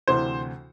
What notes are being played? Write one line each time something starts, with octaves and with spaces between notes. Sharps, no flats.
D2 C3 E3 C5